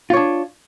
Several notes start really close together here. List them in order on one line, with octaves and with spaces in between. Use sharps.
F4 C#5 D4